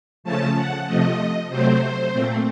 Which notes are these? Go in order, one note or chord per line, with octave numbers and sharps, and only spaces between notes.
C#3 F3 A3 C#4 A5
F#5
C3 F3 A3 D#5
C3 F#3 A3 C4 C5
A#2 A3 C4